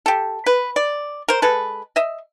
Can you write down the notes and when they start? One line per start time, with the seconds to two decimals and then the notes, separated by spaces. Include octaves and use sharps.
0.06 G4 A4
0.46 B4
0.76 D5
1.28 A#4 C5
1.42 G#3 A4 B4
1.96 D#5 E5